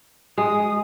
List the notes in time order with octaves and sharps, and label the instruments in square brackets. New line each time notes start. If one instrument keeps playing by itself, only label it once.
[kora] G#3 [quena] D#6